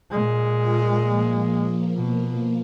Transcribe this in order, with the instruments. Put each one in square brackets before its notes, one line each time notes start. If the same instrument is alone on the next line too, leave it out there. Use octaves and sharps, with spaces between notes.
[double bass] A#2 G#3
[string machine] F4 A#4
F3 A#3
[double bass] B2